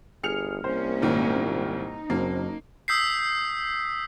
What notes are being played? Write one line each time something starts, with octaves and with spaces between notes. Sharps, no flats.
G1 G#4 F6 C#7 F7
C2 A#3 C#4 C5
G#1 A#2 D#3
D#4
F#1 F#3 A#3 C4
D#6 E6 G6 B6 C7